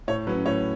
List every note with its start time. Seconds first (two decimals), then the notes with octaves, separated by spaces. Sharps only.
0.08 A2 C#5
0.27 F#3 C#4 B4
0.46 A2 C#5